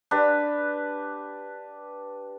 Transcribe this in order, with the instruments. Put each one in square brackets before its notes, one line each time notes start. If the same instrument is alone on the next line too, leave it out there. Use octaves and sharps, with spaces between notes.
[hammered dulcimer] D4 G4 B4